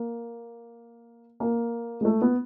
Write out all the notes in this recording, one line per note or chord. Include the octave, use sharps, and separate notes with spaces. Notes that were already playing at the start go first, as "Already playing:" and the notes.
Already playing: A#3
A#3
G#3
A3
B3